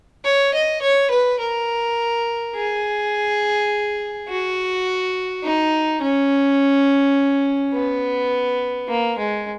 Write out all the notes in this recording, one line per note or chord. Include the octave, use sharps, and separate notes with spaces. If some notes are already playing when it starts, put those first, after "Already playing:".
C#5
D#5
C#5
B4
A#4
G#4
F#4
D#4
C#4
B3
A#3
G#3